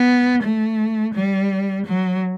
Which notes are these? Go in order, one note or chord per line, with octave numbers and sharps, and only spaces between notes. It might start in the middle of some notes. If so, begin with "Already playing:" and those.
Already playing: B3
A3
G3
F#3